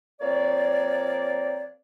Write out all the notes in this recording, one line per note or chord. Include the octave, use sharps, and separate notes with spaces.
F3 A#3 C4 C#5 D5